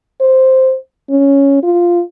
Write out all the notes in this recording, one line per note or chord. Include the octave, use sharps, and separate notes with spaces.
C5
C#4
F4